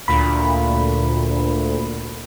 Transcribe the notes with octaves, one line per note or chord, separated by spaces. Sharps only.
D2 A#2 B5